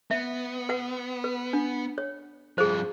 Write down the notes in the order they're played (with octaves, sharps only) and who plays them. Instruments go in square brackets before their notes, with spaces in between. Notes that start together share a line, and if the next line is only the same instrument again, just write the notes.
[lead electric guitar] B3 [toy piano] E5
[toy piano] B4 F#5
B4
D4
C#5
[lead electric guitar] G2 F3 [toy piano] G#4 C5